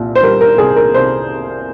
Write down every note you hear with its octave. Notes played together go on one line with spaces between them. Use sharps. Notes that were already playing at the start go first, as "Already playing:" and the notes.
Already playing: C2 A#2
C5
G3 A#4
A#4
C2 G#4
A#4
C2 C5